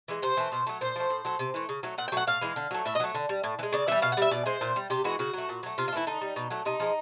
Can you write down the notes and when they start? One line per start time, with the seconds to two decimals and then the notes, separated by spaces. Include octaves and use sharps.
0.08 E3 G#3
0.22 C3 C5
0.37 E3 A3
0.52 B2
0.67 F#3 A3
0.81 A#2 C5
0.96 F3 A3
1.10 A2
1.25 F#3 A3
1.39 C3
1.54 E3 A3
1.69 C#3
1.83 F#3 A3
1.98 A#2 F#5
2.08 G5
2.12 F#3 A3 F#5
2.27 A2 F5
2.42 E3 G#3
2.56 D3
2.71 F#3 A3
2.85 A2 E5
2.95 D#5
3.00 F#3 A3
3.15 D3
3.29 G3
3.44 A2
3.59 E3
3.63 G#3
3.73 C#3 D5
3.87 E3 G3 E5
4.02 B2 F5
4.12 F#5
4.17 G3 E5
4.31 B2 D5
4.46 G#3 C5
4.61 A#2
4.76 G3
4.90 C3 G4
5.04 E3 G#3 F#4
5.19 C#3 F#4
5.33 F#3 A3
5.49 A#2
5.63 F#3 A3
5.78 C3 F4
5.88 F4
5.92 E3 A3 E4
6.07 D3 D#4
6.21 G3
6.36 B2
6.50 F#3 A3
6.65 C3 D#4
6.80 F3 G#3